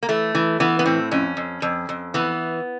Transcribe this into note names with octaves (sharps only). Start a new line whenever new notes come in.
A#3
E3 A3
E3
E3 B3
B3
A2 C4
F2 C#4
F2
F2
F2
E3 B3